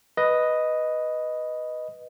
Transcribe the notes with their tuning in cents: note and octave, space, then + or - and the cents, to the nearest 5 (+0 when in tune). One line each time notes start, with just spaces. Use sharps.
B4 +0 D#5 +0